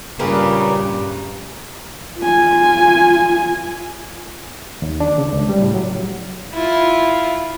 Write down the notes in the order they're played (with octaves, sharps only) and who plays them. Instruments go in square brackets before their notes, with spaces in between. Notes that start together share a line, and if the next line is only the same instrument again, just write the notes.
[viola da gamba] G2 G3 [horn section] A#2 C#3 [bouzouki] G4 A#4 B4
[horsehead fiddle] F4 G#5
[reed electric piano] D#2
D4
C#3
C#2
G3
A2
F#3
[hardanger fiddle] E4 F4